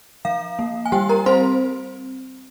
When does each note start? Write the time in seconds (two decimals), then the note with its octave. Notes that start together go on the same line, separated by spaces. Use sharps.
0.25 F3 F5
0.59 A#3
0.86 G#5
0.92 G3 G4 G5
1.09 A#4 A#5
1.26 C4 C5 C6